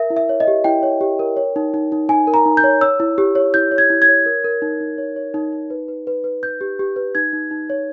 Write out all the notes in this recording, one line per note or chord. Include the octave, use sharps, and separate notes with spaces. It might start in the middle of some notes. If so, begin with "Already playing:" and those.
Already playing: A#4 E5
E4
E5
C#5
D#5
G4
E4 G5
C#5
G4
A#4
C#5
D#4
D#4
D#4
D#4 G#5
A#4
A#5
D#4
G6
C#5
C#5 E6
E4
G4
C#5
E4 G6
C#5
G#6
E4
G#6
C#5
A#4
A#4
D#4
D#4
C#5
C#5
D#4
D#4
B4
B4
B4
B4
B4 G6
G4
G4
B4
D#4 G#6
D#4
D#4
C#5